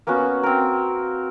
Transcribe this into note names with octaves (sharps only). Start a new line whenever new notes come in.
A#3 B3 C#4 F#4
C4 A#4